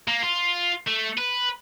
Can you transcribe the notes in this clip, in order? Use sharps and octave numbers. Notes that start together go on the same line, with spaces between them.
A#3
F4
A3
B4